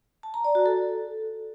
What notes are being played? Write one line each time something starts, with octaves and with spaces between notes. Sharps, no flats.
A5
A#5
D5
F#4
A4